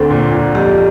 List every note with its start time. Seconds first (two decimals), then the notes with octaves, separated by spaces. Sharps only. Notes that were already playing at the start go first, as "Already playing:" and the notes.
Already playing: D2 C4 A4
0.11 A#2
0.32 A#2
0.55 F2 G4